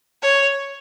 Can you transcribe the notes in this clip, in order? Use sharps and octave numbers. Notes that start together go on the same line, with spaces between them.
C#5